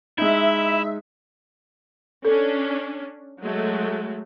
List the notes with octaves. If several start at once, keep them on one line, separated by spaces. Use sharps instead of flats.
G#3 D#4 E4 E5
C#4 D4 A4
F#3 G#3 A3